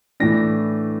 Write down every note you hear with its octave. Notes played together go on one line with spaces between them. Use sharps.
A2 E3 A3 D4 A#6